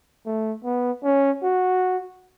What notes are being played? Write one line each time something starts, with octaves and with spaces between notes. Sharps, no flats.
A3
B3
C#4
F#4